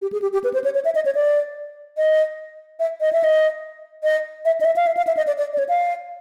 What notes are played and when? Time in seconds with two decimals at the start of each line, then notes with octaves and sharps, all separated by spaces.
0.02 G4
0.12 G#4
0.22 G4
0.33 G4
0.44 B4
0.54 C5
0.64 C#5
0.74 C#5
0.85 E5
0.95 D#5
1.05 C#5
1.15 D5
1.97 D#5
2.80 E5
3.01 D#5
3.13 E5
3.24 D#5
4.03 D#5
4.45 E5
4.61 D#5
4.65 E5
4.76 F5
4.87 E5
4.97 F5
5.07 E5
5.17 D#5
5.27 D5
5.38 D5
5.53 D5
5.58 C#5
5.69 F5